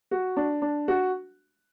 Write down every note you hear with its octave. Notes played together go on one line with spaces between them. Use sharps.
F#4
D4
D4
F#4